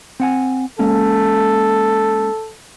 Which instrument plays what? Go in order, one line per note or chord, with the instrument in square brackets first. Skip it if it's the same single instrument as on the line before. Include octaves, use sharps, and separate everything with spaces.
[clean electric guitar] C4 F#5 G#5
[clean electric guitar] G#3 A#3 C#4 [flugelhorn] A4